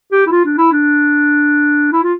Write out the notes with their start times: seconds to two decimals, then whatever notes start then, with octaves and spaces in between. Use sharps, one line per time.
0.12 G4
0.27 E4
0.31 F4
0.45 D4
0.58 E4
0.72 D4
1.92 E4
2.03 F4